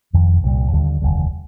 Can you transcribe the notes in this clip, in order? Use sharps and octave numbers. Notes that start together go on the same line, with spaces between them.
F1 F2 D#3
C2 A#2 G3
D#2 D3 G3
F1 D#2 D3 G3